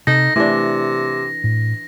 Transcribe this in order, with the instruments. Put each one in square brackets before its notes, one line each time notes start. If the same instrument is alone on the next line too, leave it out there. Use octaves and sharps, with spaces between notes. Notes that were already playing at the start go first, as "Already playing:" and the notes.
[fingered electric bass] C3 [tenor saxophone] D#4 [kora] A4 [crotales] A#6
[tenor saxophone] C3 [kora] E3 D4 [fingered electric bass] A3
[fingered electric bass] A2